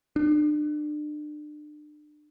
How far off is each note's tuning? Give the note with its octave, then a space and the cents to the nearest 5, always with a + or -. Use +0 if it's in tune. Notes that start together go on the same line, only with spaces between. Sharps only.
D4 +35